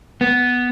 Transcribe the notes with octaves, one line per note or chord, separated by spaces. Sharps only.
B3